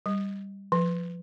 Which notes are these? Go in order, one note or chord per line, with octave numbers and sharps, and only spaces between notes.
G3
F3